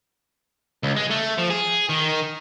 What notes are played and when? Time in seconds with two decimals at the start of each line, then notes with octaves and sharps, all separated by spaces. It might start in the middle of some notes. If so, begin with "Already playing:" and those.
0.83 C#2
0.96 G#3
1.10 A3
1.38 F3
1.50 G#4
1.89 D#3